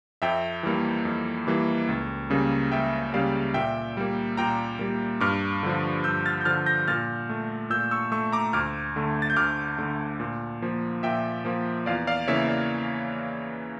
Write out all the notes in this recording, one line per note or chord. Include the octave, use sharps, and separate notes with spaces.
F2 E5 G5
E3 G3 A#3
F2
E3 G3 A#3
C#2
C#3 G3 A#3
C#2 E5 G5
C#3 G3 A#3 D5 F5
A#2 E5 G5
G3 A#3
A#2 G5 A#5
G3 A#3
G2 D6 F6
D3 F3
G2 E6 G6
F6 A6
G6
D3 F3 F6 A6
G6 A#6
A#2 F6 A6
A3
A#2 E6 G6
C#6 E6
A3 C#6 E6
A#5 D6
D2 D6 F6
D3 A3
A6
G6
D2 D6 F6
D3 A3
A#2
F3 A#3
A#2 E5 G5
F3 A#3
E2 D5 F5
D5 F5
C#3 E3 A#3 C#5 E5
D5